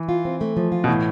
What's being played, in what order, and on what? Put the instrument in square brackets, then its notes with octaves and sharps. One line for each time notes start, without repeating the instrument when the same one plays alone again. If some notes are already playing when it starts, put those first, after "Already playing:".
Already playing: [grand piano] E3
[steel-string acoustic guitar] F4
C4
A3
F3
F4
[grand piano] B2
[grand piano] A2 [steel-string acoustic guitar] E3